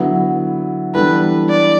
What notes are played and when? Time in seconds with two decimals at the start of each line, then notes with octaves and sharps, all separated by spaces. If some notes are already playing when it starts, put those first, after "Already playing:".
Already playing: D3 F#3 B3 E4
0.94 E3 G3 B3 D4 A4 B4
1.50 D5